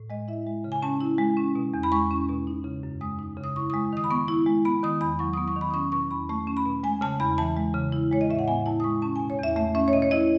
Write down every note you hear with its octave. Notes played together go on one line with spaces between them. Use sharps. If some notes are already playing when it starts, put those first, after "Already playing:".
Already playing: A2
G#3 D#5
E4 E5
G#3
C#3
G#5
C#4 A5
E4
G#3
C#4
B2
E2
B5
G#3 C#6
C#4
B2
D#4
C#3
F#2
G#3 D#6
D#4
C#3
D#6
E4 C#6
G#3 D#6
D#3 D#6
B5
B3 C#6
E4
G#3
B3 B5
D#3 D#6
E2 B5
F#3 C#6
B3 D#6
C#6
D#3
B5
D#6
C#4 C#6
B2 C#6
E2 B5
A3 C#6
C#4
B5
B2
G#3 G#5
C#3 A5
E2 B5
E3 A5
G#3
C#3
E4
G#3 C#5
D#5
A2 E5
F#5
B3 G#5
E4 A5
D#6
G#3 C#6
C#4 A5
B2 G#5
C#5
E2 E5
A3 E5
C#4 E5
C#5
B2 D#5
C#5
E4 D#5